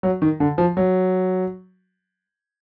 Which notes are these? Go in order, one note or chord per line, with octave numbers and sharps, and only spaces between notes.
F#3
D#3
D3
F3
F#3